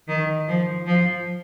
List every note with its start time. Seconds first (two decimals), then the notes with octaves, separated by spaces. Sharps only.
0.08 D#3
0.48 F3
0.86 F3